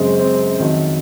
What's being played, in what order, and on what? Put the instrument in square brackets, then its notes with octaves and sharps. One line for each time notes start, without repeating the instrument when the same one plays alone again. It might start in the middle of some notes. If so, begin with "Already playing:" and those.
Already playing: [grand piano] F#2 C#3 G#3 C4
C4
F2 D#3 F#3